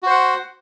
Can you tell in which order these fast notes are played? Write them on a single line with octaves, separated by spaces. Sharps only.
F#4 C5 F#5